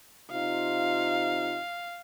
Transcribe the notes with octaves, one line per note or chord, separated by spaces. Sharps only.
C3 D#4 F4 F5